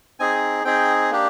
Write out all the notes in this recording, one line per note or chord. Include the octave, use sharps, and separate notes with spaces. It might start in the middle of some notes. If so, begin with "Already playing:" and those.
C4 D#4 G#4 G#5
C4 D#4 G#4 G5
A#3 D4 G4